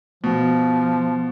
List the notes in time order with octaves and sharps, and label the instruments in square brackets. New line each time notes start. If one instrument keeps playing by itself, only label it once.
[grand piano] B2 [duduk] F3